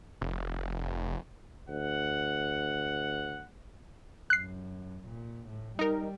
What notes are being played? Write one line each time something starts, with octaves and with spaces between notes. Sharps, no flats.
F1
D2 F#5
F#2 F#6 C7
A#2
A2
G3 D#4 A#4